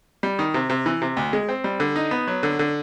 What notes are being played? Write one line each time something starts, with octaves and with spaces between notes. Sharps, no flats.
G3
D#3
C3
C3
E3
C3
D2
G#3
C4
G3
D3
D#4
B3
F#3
D3
D3